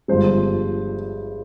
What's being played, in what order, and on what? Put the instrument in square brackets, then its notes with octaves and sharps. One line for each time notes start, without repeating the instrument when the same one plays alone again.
[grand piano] G1 G2 F3 G#3 C5